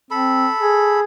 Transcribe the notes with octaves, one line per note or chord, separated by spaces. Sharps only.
C4 A4 B5
G#4